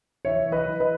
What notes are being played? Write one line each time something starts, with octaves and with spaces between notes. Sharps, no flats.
E3 C#5 E5
E3
B4 D#5
E3
B4 D#5